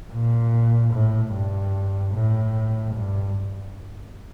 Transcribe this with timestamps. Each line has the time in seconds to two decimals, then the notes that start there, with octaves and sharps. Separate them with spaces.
0.12 A#2
0.93 A2
1.33 G2
2.14 A2
2.94 G2